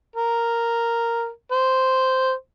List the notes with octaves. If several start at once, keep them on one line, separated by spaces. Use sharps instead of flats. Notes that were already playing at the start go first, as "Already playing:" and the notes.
A#4
C5